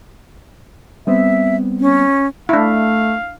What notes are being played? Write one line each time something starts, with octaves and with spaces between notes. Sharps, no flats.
G3 B3 C4 E5
C#4
A3 D4 E4 F5